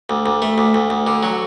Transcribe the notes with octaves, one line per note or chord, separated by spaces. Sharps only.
D2
D2
A3
D2
D2
D2
D3
F#3